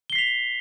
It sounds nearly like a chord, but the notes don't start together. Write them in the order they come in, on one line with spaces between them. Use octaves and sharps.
G7 C7 B6 F7